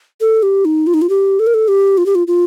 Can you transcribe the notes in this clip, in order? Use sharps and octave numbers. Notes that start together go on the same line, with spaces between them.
A4
G4
D#4
F4
D#4
F4
G4
A4
A#4
A4
G4
F4
G4
F4
F4